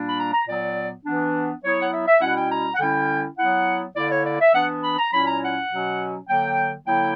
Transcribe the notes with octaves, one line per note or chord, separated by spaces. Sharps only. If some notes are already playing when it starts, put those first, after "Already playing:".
Already playing: A#2 G3 A#3 D4
B5
A#5
A#5
A#2 F#3 B3 D5
E3 B3 D4
F#3 B3 E4 C#5
F#5
E5
E5
B2 G3 C#4 E4 F#5
G5
A#5
F#5
D3 G3 C#4 E4 G5
F#3 B3 E4 F#5
D3 A#3 E4 D5
C#5
D5
E5
E3 B3 D4 F#5
B5
A#5
A#2 F#3 C#4 E4 B5
A#5
F#5
B2 F#3 C#4
D3 F#3 A#3 G5
D3 F#3 A#3 E4 G5